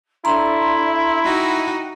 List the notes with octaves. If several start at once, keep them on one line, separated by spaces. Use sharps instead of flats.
D4 E4 A4 E5 A#5 C6
D#4 F#4 G5